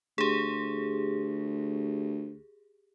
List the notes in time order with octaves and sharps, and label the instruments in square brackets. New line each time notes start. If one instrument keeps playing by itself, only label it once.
[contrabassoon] D2 [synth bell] G4 G#4